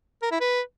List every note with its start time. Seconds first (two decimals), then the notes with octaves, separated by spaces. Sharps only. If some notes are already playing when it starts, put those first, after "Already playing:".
0.22 A#4
0.31 E4
0.41 B4